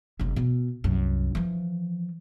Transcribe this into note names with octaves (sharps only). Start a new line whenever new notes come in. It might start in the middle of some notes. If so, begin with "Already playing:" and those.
F#1 C3
B2
C2 F#2
E3 F3